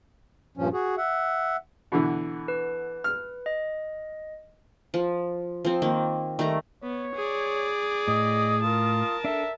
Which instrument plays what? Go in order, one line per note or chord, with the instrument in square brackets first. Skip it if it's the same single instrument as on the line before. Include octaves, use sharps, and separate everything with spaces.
[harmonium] G2 A#2 F3 C#4
F#4 G#4
E5 F#5
[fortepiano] B2 D3 E3
[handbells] B4
[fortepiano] F6
[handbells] D#5
[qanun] F3
F3 C4
D#3 A#3
D#3 G3 A3 A#5
[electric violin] B3 [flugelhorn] C#5
[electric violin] G#4 D5
[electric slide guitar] A2 [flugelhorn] D#5 [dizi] D#6
[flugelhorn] F4 [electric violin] A#4 A5
[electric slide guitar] D4 A4 [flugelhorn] E5